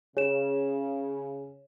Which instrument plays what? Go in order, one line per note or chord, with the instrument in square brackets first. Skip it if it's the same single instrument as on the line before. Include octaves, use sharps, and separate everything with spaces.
[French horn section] C#3 [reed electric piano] G#4 [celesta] C#5 E7